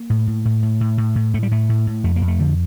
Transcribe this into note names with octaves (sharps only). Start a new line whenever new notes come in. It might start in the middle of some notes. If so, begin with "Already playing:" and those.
Already playing: A#3
A2
A2
A2
A2
A2
A2
A2
A2 A3
G3
A2 A3
A2
A2
F2 A3
A#3
F2
A3
D3 F3